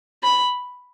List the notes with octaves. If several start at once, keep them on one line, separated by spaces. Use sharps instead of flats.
B5